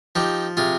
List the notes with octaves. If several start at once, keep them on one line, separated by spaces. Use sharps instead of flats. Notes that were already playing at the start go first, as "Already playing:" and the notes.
F3 D#4 G4
C3 F4 G#4